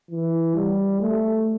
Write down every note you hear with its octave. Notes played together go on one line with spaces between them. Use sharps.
E3
G3
A3